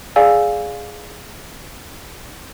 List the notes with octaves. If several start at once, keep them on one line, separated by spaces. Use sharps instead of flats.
G#4 D5 F5 G#5 E6